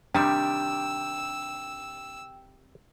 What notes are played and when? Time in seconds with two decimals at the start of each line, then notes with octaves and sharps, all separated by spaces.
0.15 C3 D#3 G3 D4 G5 E6